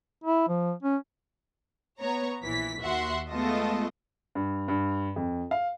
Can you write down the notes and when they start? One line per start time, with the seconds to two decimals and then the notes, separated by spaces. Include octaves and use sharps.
0.24 E4
0.49 F3
0.83 C#4
2.00 B3 C#5 A#5
2.43 A#1 E3 B6
2.80 D#2 F#4 E5 F#5 C6
3.30 G#3 A3 B3 F4 A4 D#5
4.35 G2
4.68 G2
5.16 F2
5.51 F5